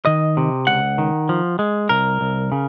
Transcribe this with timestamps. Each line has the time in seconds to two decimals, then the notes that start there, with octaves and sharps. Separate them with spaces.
0.05 D#3 D#5
0.37 C3
0.67 C#2 F#5
0.98 D#3
1.29 F3
1.59 G#3
1.89 C2 A#4
2.21 C2
2.52 C#3